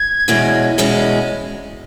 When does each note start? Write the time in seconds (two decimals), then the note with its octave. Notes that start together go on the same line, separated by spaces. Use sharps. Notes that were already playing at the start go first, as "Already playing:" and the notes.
Already playing: G#6
0.28 E2 B2 G#3 C#4
0.78 E2 B2 G#3 C#4